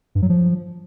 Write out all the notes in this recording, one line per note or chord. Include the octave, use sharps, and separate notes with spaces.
G2
F#3
F3